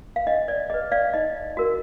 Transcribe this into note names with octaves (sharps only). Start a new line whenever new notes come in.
F5
D4 D#5
D5
G#4 B4 D#5
D5 F5
D#4 D#5
F#4 A#4